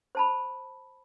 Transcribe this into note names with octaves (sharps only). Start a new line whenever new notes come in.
C5 A5 B5